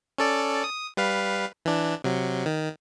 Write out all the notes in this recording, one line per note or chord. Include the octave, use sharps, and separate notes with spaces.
C#4 A4 D5
D#6
G3 B4 F5
E3 D4
C3 F#3
D#3